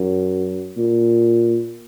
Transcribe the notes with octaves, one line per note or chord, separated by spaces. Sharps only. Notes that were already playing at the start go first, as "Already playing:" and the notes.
Already playing: F#2
A#2